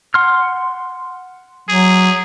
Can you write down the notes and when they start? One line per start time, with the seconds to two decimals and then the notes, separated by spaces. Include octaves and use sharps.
0.14 F#5 C6 F6
1.69 F#3 G#4